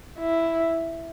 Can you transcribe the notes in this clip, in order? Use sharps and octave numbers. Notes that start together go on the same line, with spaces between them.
E4